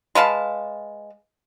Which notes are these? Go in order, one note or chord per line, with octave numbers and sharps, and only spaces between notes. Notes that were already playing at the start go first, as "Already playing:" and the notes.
G#3 B4 F5 A5